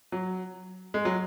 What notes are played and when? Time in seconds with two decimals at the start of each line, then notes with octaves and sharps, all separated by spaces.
0.12 F#3
0.94 G#3
1.05 F#3